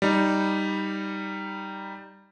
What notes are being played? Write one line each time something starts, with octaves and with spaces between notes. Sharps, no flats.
G3 D#4